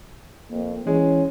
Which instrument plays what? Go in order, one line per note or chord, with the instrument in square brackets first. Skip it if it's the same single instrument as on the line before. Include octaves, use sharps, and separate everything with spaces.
[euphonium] F2 [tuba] A#3
[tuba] E3 [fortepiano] G#3 [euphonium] C#4